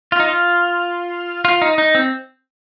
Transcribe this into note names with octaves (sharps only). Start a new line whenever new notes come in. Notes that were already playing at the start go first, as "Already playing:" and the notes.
F4
D#4
F4
F4
D#4
D#4
C4